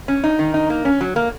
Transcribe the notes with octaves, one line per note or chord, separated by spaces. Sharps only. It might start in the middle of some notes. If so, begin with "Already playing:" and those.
C#4
D#4
D#3
D#4
A#3
C#4
F#3
A#3